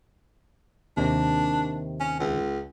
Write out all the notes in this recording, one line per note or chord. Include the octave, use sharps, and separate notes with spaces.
D#2 C3 D#3 D4
C#4
C#2